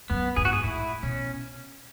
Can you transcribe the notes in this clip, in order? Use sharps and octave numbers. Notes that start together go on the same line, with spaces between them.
F#2 B3
G#2 G#4
F#4
G#4
A2 E4
B2 C#4